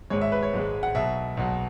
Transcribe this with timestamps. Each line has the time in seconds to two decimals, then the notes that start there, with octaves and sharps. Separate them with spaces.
0.10 G#1 G#2 G#3 C#5
0.21 E5
0.32 B4
0.43 C#5
0.53 G#1 G#2 G#3
0.83 F#5
0.95 B1 B2 F#3 E5
1.37 B1 B2 F#3